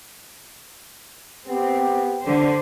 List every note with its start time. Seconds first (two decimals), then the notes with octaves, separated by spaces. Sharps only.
1.47 B3 C4 G4
2.23 D3 C5